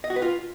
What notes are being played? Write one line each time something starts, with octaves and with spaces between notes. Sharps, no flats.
D#5
F#4
B4
F4